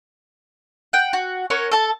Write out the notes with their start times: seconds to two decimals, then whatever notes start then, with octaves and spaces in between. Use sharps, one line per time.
0.93 F#5 G5
1.13 F#4
1.50 C#4 A#4 C#5 F#5
1.72 A4 A5